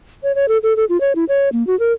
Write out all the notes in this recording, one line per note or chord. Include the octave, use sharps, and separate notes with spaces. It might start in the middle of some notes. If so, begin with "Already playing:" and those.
C#5
C#5
A4
A4
A4
F4
C#5
E4
C#5
A#3
F#4
A#4